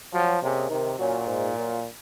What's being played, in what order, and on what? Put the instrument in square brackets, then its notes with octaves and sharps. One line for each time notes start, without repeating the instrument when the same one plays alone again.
[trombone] F3 [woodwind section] F#3
[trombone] C3 [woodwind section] A#3 C#4 G#4 D#5
[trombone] C3 [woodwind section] D#3
[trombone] A#2 [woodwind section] F#3 C#4
[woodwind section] G#2
F#3 A#3 F4